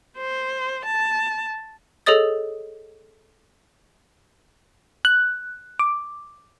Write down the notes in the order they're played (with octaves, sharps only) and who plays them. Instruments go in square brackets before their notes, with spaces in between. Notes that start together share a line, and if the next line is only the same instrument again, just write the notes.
[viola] C5
A5
[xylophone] G#4 A4 C#5 D#5 D#6 A6
[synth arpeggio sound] F#6
D6